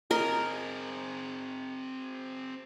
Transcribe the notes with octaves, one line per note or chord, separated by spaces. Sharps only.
C4 G#4 A#4 D#5